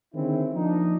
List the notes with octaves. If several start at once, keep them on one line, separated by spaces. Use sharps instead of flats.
D3 D#3 G#3 C4 C#4 E4
F3 A#3 D4 D#4